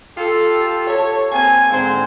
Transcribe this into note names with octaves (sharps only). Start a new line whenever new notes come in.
F4 G4 A4
G4 A4 C#5
A#3 C4 G#5
G#2 D3 G#3 C4 C5